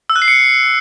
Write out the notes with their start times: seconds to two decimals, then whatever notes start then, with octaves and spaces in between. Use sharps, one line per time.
0.10 E6
0.16 F#6
0.22 C7
0.28 C#7